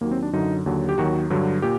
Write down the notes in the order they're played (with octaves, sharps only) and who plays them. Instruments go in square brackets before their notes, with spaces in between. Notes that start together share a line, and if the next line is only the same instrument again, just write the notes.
[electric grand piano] D#2 D#3 F#3 A#3
C4
D4
F#2 D3 F#3 D#4
D#2 D3 F#3
G4
D#2 D#3 F#3 F#4
G2 D3 F#3
A#2 G4